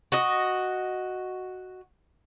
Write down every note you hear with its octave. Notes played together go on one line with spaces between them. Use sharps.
F#4 D#5